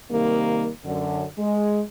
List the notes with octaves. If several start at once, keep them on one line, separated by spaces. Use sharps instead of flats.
C3 D#3 G3 A#3
F#2 D3
G#3